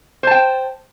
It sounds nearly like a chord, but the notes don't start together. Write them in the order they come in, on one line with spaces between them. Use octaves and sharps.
C5 A5 G5